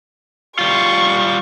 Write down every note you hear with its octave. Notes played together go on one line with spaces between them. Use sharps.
G3 F4 C#6